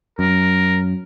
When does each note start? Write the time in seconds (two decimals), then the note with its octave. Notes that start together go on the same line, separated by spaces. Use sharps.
0.19 F#2 A#4